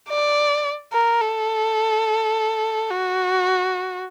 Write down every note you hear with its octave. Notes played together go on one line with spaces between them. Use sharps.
D5
A#4
A4
F#4